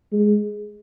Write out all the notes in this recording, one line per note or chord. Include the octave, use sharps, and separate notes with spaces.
G#3